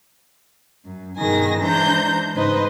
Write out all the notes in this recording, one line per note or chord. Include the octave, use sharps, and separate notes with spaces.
F#2
G2 B2 D#3 G#4 G#5 A#6
E3 G#3 D4 C5 A#5 G6
G#2 C#3 D#4 B4 C5 D#5